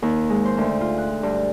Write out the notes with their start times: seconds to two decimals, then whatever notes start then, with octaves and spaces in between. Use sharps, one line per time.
0.02 D#2
0.30 G#3
0.45 C5
0.58 D2
0.81 F4
0.98 F#6
1.23 G2